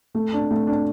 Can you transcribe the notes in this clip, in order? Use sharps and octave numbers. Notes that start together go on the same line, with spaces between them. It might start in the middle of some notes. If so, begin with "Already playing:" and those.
A3
D4
A3
D4